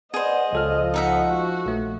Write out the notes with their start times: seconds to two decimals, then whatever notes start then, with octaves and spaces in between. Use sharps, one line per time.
0.14 G#4 B4 C5 D5 D#5 F#5
0.53 C#2 F3 A4 F6
0.94 D#4 E5 F#5
1.28 F#4
1.66 A#1 A3